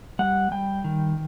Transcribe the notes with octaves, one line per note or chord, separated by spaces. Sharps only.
G3 F#5
G3 G5
D#3